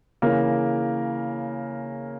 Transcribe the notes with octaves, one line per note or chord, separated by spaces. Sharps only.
C#3 E3 A#3 A#4